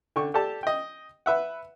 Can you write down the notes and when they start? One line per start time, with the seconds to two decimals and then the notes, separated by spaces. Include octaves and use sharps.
0.16 D3 G5 C#6
0.34 G4 A4 D5 A5
0.63 D#5 G5
1.26 B4 E5 F#5